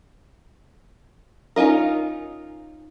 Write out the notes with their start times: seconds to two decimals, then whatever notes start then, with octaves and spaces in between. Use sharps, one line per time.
1.56 C#4 D#4 F4 A#4